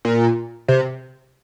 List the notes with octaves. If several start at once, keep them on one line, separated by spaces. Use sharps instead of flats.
A#2
C3